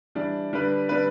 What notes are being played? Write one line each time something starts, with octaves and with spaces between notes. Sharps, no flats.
E3 G3 D4
D3 G3 D4 B4
D3 G3 D4 B4